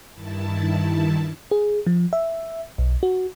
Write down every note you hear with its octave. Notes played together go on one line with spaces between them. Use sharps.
G2 D#3 E4 A5
G#4
F3
E5
B1
F#4